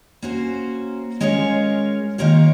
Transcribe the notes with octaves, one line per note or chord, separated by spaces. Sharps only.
A#3 C#4 F#4 C5
G#3 C#4 F4 A#4 C#5
D#3 A#3 F4 A#4 C#5